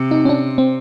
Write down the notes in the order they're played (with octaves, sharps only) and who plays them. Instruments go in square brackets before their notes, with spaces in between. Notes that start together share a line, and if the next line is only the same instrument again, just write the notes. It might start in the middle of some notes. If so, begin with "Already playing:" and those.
Already playing: [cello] C3
[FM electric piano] D#4
C#4
D4
C4